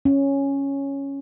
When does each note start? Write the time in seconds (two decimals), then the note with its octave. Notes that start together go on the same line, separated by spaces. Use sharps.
0.05 C#4